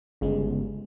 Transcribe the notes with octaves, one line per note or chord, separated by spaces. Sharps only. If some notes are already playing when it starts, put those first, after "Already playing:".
G1 C#3 G#3